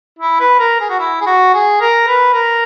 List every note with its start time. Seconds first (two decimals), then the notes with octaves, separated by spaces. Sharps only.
0.19 E4
0.40 B4
0.59 A#4
0.80 G#4
0.90 F#4
1.00 E4
1.21 G#4
1.27 F#4
1.54 G#4
1.81 A#4
2.08 B4
2.34 A#4